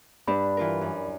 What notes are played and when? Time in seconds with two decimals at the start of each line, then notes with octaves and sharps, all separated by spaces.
0.28 G2 D4 D5 B5
0.57 E3 F4 A#4
0.81 F#2